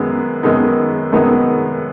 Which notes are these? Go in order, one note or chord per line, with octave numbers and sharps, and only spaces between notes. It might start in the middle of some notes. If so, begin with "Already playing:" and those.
Already playing: F#2 D#3 G#3 B3 D#4
F#2 D#3 G#3 B3 D#4
F#2 D#3 G#3 B3 D#4